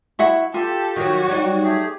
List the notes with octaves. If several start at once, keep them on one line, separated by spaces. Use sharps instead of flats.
E4 F#4 E5 F#5
F4 G4 A4
D#3 F#3 F#4
F#3 G3 D#4
A3 G4 G#4